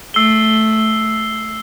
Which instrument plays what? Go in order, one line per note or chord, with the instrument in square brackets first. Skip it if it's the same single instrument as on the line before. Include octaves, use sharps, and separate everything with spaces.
[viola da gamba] A3 [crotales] E6 C7 G7